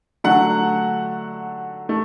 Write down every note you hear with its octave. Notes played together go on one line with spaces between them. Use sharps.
D3 F#3 A3 F#5
A3